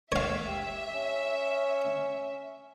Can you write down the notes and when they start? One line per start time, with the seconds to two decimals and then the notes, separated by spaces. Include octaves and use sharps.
0.12 C#5 E5 F5
0.48 G4
0.94 C#4